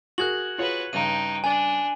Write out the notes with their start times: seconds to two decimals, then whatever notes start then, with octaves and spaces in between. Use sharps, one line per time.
0.18 F#4 G#4 A#4 F#6 G#6 F#7
0.58 F4 F#4 G#4 B4 C#5
0.93 G2 C#3 D#4 G5 D#7
1.44 D4 G#5